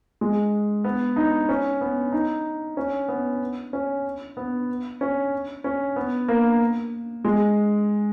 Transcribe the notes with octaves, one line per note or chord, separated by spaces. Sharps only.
G#3
B3
D#4
C#4
B3
D#4
C#4
B3
C#4
B3
C#4
C#4
B3
A#3
G#3